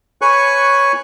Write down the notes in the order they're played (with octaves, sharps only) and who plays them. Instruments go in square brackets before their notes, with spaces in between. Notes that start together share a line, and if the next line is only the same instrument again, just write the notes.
[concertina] B4 C#5 G#5 C#6 F#6